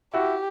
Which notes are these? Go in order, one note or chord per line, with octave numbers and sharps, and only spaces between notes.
E4 F#4 G4